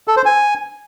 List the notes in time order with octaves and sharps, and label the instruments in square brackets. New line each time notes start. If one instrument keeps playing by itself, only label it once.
[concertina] A4
C5
G#5